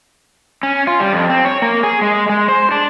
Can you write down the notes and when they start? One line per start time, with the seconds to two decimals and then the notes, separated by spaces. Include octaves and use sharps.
0.63 C#4
0.87 F4
1.00 G3
1.13 F2
1.30 C4
1.45 C#5
1.62 A#3
1.83 G#4
2.02 G#3
2.29 G#3
2.48 C5
2.72 D4